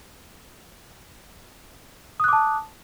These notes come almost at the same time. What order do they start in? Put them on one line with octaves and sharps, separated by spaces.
D#6 F#6 D6 A5